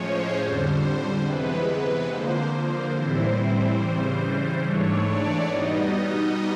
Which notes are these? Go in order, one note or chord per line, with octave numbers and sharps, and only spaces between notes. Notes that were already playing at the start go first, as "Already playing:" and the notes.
Already playing: A2 F3 G#3 C#4 C5 C#5
F2 D3 G3
C3 E3 G#3 B3 B4
B4
D3 F3 A#3 C5
C5
A2 E3 G3 C4 E4
C#3 E3 G3 C5
C5
G#2 E3 A3 D4 C#5
D5
B2 G3 B3 D#4 D#5
D#5